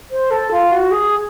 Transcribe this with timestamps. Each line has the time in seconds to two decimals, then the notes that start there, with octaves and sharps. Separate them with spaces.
0.10 C5
0.30 A4
0.50 F4
0.71 F#4
0.90 G#4